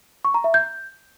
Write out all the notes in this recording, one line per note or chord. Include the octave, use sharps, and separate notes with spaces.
C#6
A#5
E5
G6